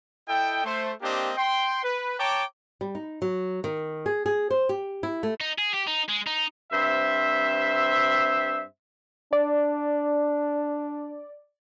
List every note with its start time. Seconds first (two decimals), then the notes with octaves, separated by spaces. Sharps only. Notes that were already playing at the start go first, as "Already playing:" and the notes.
0.28 E4 A4 D#5 G5
0.64 A3 C5
1.02 A#3 C4 D4 G4 C5 D#5
1.37 G5 C6
1.83 B4
2.19 C#5 G5 A5 A#5 D6
2.81 G3
2.95 D#4
3.22 F#3
3.64 D#3
4.06 G#4
4.26 G#4
4.51 C5
4.69 G4
5.03 E4
5.23 A3
5.41 D#4
5.58 G#4
5.73 G4
5.87 D#4
6.09 G#3
6.27 D#4
6.72 G2 C4 C5 E5
9.33 D4 D5